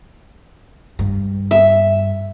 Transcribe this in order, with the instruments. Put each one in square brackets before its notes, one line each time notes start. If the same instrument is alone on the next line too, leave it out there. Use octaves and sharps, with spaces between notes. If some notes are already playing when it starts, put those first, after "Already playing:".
[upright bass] G2
[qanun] E5